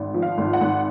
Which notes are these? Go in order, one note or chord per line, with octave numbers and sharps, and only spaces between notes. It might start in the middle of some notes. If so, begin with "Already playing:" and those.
Already playing: G#1
F3
F5
G#1
F#5
G#1